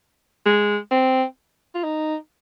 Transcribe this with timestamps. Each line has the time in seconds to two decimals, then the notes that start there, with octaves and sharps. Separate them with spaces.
0.46 G#3
0.91 C4
1.75 F4
1.84 D#4